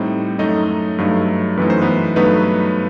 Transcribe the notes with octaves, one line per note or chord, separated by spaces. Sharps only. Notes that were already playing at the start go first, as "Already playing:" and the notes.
Already playing: A2 G3 C4 D#4
F#2 F#3 A3 D#4 D#5
G2 F#3 A3 D#4
F#2 E3 A3 D#4 B4
C5
B3 B4
G2 F#3 A3 B3 D#4 B4